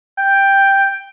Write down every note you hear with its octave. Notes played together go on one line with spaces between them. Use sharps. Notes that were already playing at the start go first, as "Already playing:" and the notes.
G5